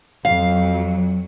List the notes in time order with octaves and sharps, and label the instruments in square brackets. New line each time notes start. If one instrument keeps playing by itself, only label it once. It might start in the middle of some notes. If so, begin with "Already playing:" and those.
[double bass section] F2 [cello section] F#3 [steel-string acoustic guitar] F5